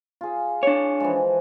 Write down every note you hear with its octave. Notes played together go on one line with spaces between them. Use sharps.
F4 G#4
D4 C#5
E3 F3 G#3